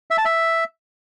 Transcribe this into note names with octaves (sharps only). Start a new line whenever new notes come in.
E5
A5
E5